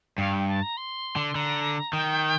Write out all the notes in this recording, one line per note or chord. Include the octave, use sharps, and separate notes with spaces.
G2 F5
G5
A5
A#5
C6
D3
D3 A#5
D#3 G5